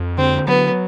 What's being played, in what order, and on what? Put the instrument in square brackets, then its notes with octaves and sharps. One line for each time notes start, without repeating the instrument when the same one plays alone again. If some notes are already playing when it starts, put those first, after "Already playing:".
Already playing: [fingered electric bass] F2
[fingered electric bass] D3 [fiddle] C4
[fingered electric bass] F#3 [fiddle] B3